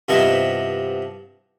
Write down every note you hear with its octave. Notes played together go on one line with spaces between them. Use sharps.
G2 C3 F3 B3 E4 D#5